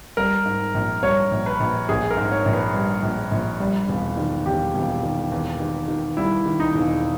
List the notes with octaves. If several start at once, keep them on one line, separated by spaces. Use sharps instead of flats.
G3 A#4
G#2
A#1
G3 C#5
A#1
B4
A#1
A#1 G#4
A#4
G#2
C#5
A#1
B4
G3
A#1
A#1
G3
E1
D#3
E1 G4
E1
D#3
E2
D#3
D#3
G3 E4
D#3
D#4
E1